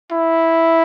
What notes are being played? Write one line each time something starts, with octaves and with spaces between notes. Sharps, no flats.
E4